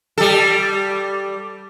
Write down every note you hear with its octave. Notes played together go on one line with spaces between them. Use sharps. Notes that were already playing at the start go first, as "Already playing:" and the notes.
G3 A4